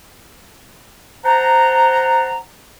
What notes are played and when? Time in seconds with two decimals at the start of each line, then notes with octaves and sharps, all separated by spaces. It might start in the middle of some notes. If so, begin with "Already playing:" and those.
1.25 C5 F#5 A5 A#5